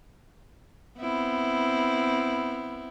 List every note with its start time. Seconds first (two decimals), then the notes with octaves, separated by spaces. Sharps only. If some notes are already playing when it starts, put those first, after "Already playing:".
0.99 B3 C4 E4